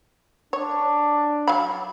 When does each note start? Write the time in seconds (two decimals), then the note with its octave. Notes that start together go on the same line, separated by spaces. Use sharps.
0.53 D4 C#5
1.48 F#3 F5 B5